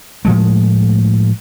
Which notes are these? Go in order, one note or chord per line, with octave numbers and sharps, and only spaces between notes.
A2 F3 G#3 A3